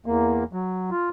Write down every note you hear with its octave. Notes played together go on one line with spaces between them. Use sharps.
E2 A#3
F#3
F4